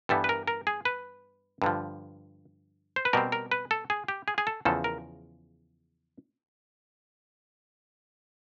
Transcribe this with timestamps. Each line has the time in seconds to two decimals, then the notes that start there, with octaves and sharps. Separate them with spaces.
0.09 G2 E3 G3 B3 A4
0.24 B4
0.29 A#4
0.48 A#4
0.67 G#4
0.85 B4
1.62 G2 D3 F3
2.96 C5
3.05 B4
3.13 B2 G3 C4 A#4
3.32 A#4
3.51 B4
3.71 A4
3.90 G#4
4.08 G4
4.28 G#4
4.38 G#4
4.47 A4
4.65 E2 C#3 F3 A4
4.84 A#4